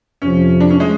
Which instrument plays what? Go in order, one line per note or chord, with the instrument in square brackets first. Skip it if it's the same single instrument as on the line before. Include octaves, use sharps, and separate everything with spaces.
[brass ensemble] F2 C3 F3 [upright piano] C#4
[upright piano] D4
C#4
G#3